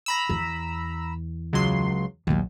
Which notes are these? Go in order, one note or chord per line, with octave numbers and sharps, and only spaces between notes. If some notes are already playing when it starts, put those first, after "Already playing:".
A#5 B5 E6
E2
C#2 F#3 C6
A#1 D#2 F#3